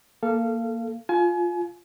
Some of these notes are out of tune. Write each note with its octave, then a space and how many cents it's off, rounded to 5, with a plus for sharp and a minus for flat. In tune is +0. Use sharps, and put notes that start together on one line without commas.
A#3 +0 A4 +0 F5 -20
F4 +5 G#5 +35